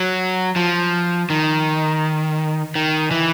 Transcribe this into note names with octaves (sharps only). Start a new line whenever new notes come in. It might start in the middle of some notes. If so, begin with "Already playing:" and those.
Already playing: F#3
F3
D#3
D#3
E3